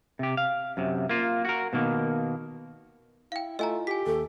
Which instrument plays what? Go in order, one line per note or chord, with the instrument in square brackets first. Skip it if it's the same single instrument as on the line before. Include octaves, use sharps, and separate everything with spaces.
[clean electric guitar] C3 G4
F5
F#2 C3
A#3 F4
F#4 A#4
B2 D#3 A#3
[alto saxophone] E4 [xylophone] F5 G5
[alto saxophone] A3 [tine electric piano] E4 F4 [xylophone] D#5 G#5 A#5
[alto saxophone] G4 [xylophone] G#5 B6
[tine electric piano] D#2 [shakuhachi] A4